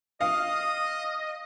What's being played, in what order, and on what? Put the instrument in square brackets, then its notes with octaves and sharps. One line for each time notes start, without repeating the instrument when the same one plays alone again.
[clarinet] D#5 [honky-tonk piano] F5 [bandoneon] D#6